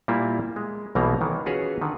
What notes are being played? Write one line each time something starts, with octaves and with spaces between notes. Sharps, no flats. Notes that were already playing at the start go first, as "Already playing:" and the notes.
A#2 G3 A#3 E4 F4
G#3
B1 B2 E3 G3 A#3 A#5
D#3 E3
C#4 F4 F#4 G#4 B4 C#5
D3 D#3